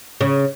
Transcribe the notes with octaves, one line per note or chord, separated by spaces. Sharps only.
C#3